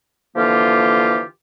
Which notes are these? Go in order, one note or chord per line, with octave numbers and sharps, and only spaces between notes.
D3 E3 F3 A#3 F4 G4